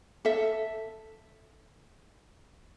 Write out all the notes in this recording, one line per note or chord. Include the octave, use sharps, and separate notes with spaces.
A4 E5